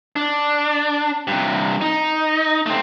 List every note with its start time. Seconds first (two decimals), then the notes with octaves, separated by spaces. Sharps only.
0.16 D4
1.27 G2 C3
1.81 D#4
2.66 A3 C4